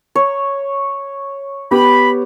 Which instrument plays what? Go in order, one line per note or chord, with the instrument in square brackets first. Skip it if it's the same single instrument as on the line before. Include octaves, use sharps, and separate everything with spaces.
[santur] C#5
[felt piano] B3 G4 [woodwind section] B5